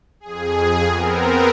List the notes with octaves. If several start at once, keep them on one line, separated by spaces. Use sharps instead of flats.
F2 G#4
B3 C4 A#4